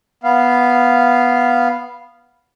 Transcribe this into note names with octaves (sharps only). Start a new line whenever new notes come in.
B3 F5